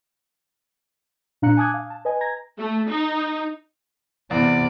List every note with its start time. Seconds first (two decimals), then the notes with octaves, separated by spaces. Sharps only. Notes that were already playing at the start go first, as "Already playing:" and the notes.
1.42 A#2 D4 F5 A#5 F#6 C#7
1.57 G#5 A5 D6 D#6 F#6 G#6
1.74 F5
1.90 A5
2.05 B4 D#5 G#5
2.21 A#5 G#6 A#6
2.59 A3
2.89 D#4
4.31 E2 C3 B3 D5